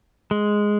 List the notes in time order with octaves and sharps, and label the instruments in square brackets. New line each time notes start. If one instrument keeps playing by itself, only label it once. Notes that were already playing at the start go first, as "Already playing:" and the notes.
[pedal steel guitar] G#3